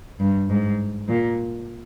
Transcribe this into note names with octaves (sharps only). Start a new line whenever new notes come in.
G2
G#2
A#2